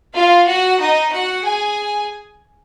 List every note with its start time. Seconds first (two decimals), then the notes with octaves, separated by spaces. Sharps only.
0.14 F4 F5
0.47 F#4 F#5
0.79 D#4 D#5
1.12 F#4 F#5
1.44 G#4 G#5